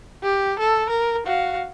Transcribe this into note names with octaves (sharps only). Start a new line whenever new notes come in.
G4
A4
A#4
F#4 F5